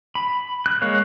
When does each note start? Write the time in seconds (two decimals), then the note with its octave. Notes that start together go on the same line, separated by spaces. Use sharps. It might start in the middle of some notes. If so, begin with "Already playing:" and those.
0.15 B5
0.66 F#6
0.82 G#3 A#3 C#5 F5